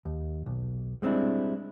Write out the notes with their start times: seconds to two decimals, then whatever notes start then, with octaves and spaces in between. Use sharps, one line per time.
0.05 D#2
0.46 B1
1.02 G3 G#3 C4 D4 E4